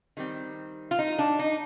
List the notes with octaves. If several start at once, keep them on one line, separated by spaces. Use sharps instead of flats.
D#3 G3 C4
F4
D#4
D4
D#4